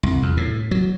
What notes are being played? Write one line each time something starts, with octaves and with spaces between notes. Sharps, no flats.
C2
E2
A2
F#3